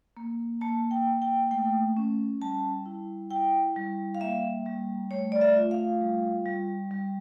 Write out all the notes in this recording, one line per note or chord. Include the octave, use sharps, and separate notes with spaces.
A#3
A#3 A5
G5
A#3
G5
A3 G5
C#4
G3 A5
E4
E4 G5
G3
F5
A#3 E5
G3
A3 C#5
D5
E5
F4
F5
G3
G3
G3